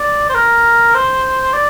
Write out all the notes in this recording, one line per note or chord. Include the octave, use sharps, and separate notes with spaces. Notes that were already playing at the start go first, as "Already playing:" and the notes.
Already playing: D5
C5
A#4
C5
D5